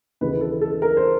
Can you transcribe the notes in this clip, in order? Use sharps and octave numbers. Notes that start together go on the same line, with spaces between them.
D#2 C#3 E3 B4
A4
A4
A#4
C5